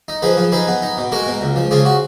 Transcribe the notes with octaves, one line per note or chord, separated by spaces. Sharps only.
D#4
F3 G#4 B4
F3
D#4 G#4 B4
B3
D#4
B2
G#3 F#4 A#4
B2
C#2
F3
C#3 F4 G#4
F#4